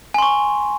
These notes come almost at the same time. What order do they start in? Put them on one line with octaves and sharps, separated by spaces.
G#5 C6 C#6